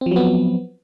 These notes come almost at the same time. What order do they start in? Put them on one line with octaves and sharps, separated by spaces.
C4 F3 F#3 B3